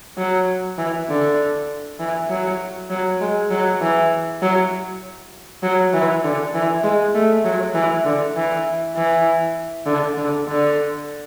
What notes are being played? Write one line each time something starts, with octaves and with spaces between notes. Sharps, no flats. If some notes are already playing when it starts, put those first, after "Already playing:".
F#3
E3
D3
E3
F#3
F#3
G#3
F#3
E3
F#3
F#3
E3
D3
E3
G#3
A3
F#3
E3
D3
E3
E3
D3
D3
D3